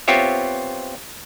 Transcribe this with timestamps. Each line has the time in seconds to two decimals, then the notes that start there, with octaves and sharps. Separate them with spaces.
0.08 B3 C4 F4 G4 C#5 E5